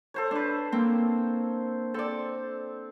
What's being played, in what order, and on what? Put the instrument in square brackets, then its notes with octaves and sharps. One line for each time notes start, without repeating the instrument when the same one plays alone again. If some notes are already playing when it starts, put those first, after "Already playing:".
[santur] A4 C5 C#5
[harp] D4 B4
A#3 C4
[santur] C4 [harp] A4 D5